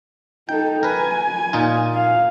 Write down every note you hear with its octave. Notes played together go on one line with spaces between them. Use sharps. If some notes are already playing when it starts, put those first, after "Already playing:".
D#4 A4 G5
A#4 B4 G#5
A#2 D#4 F4
F5